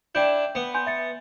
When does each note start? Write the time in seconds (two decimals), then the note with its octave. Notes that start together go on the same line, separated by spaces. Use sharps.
0.15 D4 E4 D5 G5 G6
0.55 B3
0.74 G#5 C6 G6
0.86 E5 A6 C#7